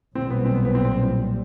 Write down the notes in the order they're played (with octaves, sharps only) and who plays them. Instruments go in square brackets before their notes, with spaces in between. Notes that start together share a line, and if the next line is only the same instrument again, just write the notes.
[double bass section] B1 A#2 G3 [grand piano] C4
[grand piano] B3
C4
B3
B3
C4
C4